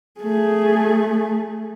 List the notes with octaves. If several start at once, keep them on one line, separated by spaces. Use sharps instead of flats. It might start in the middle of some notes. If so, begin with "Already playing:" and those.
A3 G#4